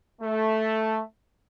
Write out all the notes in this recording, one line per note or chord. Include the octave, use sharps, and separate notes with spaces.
A3